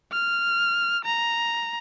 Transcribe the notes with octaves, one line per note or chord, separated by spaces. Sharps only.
F6
A#5